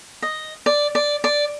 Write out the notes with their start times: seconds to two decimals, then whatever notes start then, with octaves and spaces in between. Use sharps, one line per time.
0.22 D#5
0.66 D5
0.95 D5
1.24 D5